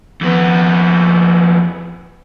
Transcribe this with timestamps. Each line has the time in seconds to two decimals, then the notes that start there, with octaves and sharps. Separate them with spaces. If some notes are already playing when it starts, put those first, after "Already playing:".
0.21 F2 B3